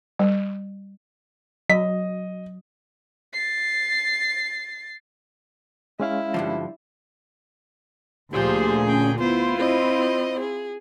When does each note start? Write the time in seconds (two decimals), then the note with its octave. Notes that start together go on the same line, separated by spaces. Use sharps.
0.19 G3
1.70 F#3 D#5 B6
3.33 A6 C7
6.00 G#3 C#4 E4 F5
6.34 G2 D3 F3
8.33 D2 A#2 F3 G4 G#4 C5
8.87 C#4 G5
9.19 B3 E4 F4 C5
9.58 C4 C5 D#5
10.40 G#4